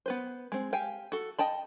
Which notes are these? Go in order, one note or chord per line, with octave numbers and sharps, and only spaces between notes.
B3 B4 C5
G#3 C4
G4 F5 G5 G#5
F#4 A4
D#5 G5 A5 B5